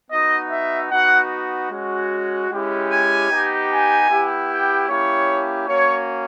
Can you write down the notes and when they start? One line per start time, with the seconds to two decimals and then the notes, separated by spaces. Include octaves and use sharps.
0.11 B3 D#4 F#4 D#5
0.51 E5
0.91 B3 D#4 F#4 F#5
1.71 G#3 C#4 F#4
2.50 G#3 C#4 E4 G4
2.90 G#5
3.30 B3 D#4 G4
3.70 G#5
4.09 B3 E4 G4
4.49 G5
4.89 A#3 C#4 E4 G4 C#5
5.68 A#3 C#4 F#4 C#5